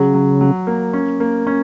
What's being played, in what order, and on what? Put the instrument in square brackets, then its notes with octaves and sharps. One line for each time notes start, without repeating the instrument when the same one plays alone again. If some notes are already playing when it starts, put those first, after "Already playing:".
Already playing: [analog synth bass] C#3 [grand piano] F#3
[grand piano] F#3
F#3
A#3
C#4
A#3
C#4